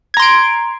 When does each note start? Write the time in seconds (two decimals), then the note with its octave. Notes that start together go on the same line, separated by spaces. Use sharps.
0.14 G#6
0.17 A#5
0.20 C6
0.22 D7